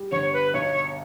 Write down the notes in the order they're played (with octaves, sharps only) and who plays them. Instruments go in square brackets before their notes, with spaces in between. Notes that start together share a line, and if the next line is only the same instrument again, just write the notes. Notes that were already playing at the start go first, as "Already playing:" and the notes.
Already playing: [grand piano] G3
[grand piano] G1 [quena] C#5
[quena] B4
[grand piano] B1 [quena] C#5